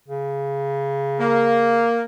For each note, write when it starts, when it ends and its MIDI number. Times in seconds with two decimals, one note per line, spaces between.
0.08 1.88 49
1.20 2.02 58